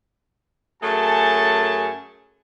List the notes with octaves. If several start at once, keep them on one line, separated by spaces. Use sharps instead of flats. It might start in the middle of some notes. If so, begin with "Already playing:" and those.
F#2 A3 C#4 G#4 A5